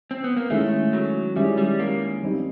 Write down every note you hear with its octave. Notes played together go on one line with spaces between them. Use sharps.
C4
B3
A#3
D#3 G#3 A3 C#4 E4 G#4
F#3
D#3 G3 G#3 C#4 E4 G#4
G3
A#3
D#3 G3 C4 D#4